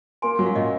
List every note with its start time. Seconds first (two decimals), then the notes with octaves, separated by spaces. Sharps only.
0.22 A#3 G#5 C6
0.39 F#3
0.46 F5
0.56 A#2 D#5 F#5